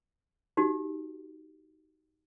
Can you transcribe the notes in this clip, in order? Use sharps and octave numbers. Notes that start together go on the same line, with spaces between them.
D#4 F#4 G4